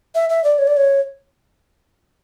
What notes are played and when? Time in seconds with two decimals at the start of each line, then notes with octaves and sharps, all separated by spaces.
0.15 E5
0.29 E5
0.44 D5
0.59 C#5
0.67 D5
0.77 C#5